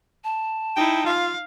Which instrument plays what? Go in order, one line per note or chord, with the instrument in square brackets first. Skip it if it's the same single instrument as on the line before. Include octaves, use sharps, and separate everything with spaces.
[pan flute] A5
[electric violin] D#4 E4 [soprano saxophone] G5
[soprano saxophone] F4 [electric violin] F5